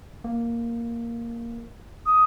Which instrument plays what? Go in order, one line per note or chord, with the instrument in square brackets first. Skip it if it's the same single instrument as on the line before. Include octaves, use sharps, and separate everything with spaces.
[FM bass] A#3
[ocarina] D#6